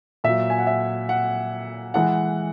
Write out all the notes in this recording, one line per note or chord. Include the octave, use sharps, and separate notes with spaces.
A#2 F#3 E5
G#5
F#5
E5
F#5
E3 G#3 F#5